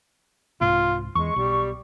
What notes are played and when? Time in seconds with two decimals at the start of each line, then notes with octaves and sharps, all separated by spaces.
0.61 C2 G#2 F4
1.15 E2 G#3 C#6
1.36 B1 G3